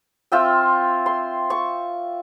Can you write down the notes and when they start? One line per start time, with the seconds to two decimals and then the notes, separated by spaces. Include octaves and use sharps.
0.32 C4 F4 E5 G5
1.06 C6
1.50 C#6